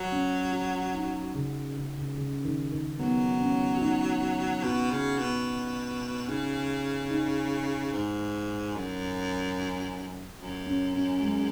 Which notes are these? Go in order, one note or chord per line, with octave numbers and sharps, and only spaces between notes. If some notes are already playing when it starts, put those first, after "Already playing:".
Already playing: F#3
C#4
F#4
D#4
C#3
C#3
C#3
C#3
D#3
D#3
F#3 B3
C#4
F#4
D#4
B2 F#4
C#3
B2
C#3 D#4
D#4
G#2
F#2
F#2
C#4
C#4
G#3